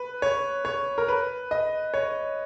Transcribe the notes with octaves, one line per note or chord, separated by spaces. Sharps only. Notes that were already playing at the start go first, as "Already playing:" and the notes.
Already playing: B4
C#5
C#5
A#4
B4
D#5
C#5